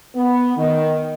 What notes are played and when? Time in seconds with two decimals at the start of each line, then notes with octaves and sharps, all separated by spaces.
0.15 B3
0.56 D#3